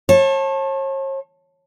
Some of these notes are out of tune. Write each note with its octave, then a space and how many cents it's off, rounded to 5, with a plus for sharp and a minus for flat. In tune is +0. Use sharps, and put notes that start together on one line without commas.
C#5 -40 F5 -10 A5 +0